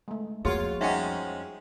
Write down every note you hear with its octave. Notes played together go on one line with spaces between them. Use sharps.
G#3 A3
F2 A#3 F4 F#4 G#4 C#5
F3 G3 G#3 C#4 D#4 E5 F#5 G5